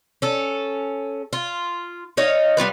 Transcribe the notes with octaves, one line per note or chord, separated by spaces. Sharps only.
C#4 A4
F4
D#4 C#5 D#5 F5
G3 B3 F4 B4